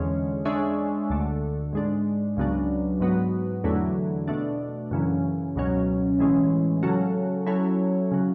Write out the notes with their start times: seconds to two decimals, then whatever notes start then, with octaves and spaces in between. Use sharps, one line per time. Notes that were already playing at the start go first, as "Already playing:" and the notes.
Already playing: E2 D3 G#3 C#4
0.45 G#3 D4 G#4 C#5 E5
1.10 D2 D3 A3
1.73 G#2 G#3 D4
2.37 C#2 C#3 F#3 B3 D4
3.00 G#2 F#3 B3 F#4
3.64 E2 D3 F#3 A3 E4
4.28 B2 A3 D4
4.91 F#2 C#3 E3
5.56 C#2 B2 F#3 C#4
6.19 A2 E3 G#3 C#4
6.83 C#3 F#3 C#4 F#4 A4
7.46 F#3 C#4 E4 A4 C#5
8.11 C#3 F#3